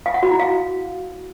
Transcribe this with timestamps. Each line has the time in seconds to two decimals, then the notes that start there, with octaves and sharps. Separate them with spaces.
0.06 F5
0.14 F#5
0.23 F#4
0.31 E4
0.40 F5